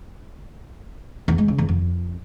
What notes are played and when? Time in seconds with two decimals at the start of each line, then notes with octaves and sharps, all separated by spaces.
1.28 E2
1.38 G#3
1.48 C#3
1.58 E2
1.69 F2